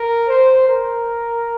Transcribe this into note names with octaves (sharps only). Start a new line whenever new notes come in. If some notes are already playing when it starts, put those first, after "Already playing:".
Already playing: A#4
C5
A#4